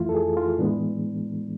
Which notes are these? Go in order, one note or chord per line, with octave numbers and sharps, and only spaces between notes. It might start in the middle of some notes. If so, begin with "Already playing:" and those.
Already playing: F2 E3 A3 E4 F4
A4
G#4
F4
A2 E3 G#3 B3 D4